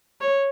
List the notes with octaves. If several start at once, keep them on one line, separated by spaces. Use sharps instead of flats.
C#5